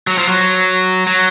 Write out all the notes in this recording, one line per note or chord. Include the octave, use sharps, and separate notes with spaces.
F#3
F3
F#3
F#3